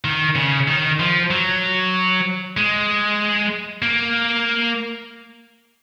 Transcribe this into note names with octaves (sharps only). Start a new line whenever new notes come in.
D#3
C#3
D#3
F3
F#3
G#3
A#3